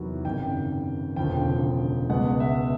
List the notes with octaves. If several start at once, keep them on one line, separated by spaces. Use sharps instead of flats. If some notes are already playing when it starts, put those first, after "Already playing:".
Already playing: E2 C3 D#3 F#3
G#1 F#2 C#3 G5
E1 D2 C#3 F3 G5
C#2 B2 G#3 F#5
E5